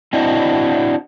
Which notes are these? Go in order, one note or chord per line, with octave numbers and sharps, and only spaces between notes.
C4 D4 E4 F#4 C5 D#5